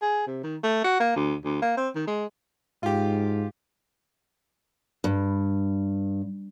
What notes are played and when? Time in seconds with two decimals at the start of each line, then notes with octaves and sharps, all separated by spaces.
0.02 G#4
0.27 C3
0.43 D#3
0.63 A3
0.84 F#4
1.00 A#3
1.16 D2
1.45 D2
1.62 A#3
1.77 C4
1.95 D#3
2.07 G#3
2.83 G#2 F4 G4
5.04 G2